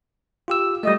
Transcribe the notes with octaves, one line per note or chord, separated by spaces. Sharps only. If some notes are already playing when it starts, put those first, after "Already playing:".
F4 G4 E6
G3 A3 D#5